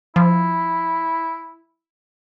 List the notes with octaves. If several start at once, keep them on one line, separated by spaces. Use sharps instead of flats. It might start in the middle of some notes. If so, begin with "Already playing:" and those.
F3 E4